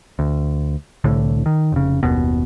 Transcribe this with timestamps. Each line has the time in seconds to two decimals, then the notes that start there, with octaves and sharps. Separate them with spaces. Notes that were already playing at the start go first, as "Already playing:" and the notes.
0.19 D2
1.04 C2 A2 D3
1.46 D#3
1.72 F1 C#3
2.03 F#1 D#2 B2